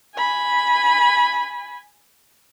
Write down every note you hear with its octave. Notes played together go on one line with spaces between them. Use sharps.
G#5 B5